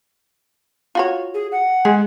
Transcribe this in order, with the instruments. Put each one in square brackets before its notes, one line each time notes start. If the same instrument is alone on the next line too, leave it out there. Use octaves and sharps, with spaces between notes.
[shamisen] F4 F#4 C#5
[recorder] G#4
F#5
[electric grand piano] G#3 [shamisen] G#4